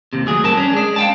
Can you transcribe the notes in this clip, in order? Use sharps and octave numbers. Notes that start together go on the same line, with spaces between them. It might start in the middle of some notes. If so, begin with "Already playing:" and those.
D#2 C3
D2 F#3 G#4
G2 A#4 A5
C#4 D4
G#3 D4
F5 G5 A5